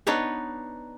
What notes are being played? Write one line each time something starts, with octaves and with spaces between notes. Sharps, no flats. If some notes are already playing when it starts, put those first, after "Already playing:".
B3 D4 D#4 B4 C#5